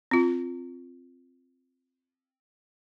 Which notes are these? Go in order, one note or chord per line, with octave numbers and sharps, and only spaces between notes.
C4 F4